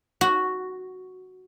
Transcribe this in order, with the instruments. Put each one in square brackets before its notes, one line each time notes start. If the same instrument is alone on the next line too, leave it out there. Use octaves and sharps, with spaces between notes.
[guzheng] F#4